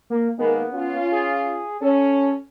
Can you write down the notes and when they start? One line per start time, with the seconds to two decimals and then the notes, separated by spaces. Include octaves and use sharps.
0.10 A#3
0.39 D#3 G#3 A#3 B3
0.73 C#4 F4
1.12 G#4
1.81 C#4 A4